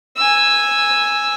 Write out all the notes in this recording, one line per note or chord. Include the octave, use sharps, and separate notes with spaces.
G#5 E6